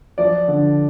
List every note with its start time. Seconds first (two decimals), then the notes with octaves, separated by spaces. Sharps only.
0.18 F3 D5
0.48 D3